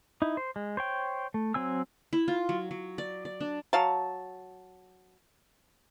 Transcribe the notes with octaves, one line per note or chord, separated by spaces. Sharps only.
D#4 E4
C5
G#3
C5 C#5 G5
A3
F#3 C4 G#5 E6
E4
F4
F#3
F#3
D5
D5
D4
F#3 F5 A5